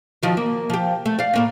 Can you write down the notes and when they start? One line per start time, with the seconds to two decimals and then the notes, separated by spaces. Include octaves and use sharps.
0.23 D#3 F3 F#3
0.37 A#3
0.70 F3 G4
1.06 A3
1.19 D5 F5
1.34 A2 A#3 C#4